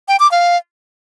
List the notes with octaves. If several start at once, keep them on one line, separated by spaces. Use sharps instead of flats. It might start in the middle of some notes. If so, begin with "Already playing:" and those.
G5
D6
F5